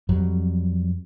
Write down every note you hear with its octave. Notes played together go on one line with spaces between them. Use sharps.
F2 F#3 G3